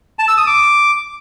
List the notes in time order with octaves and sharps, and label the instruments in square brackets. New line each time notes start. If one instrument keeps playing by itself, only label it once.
[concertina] A5
E6
D#6
D6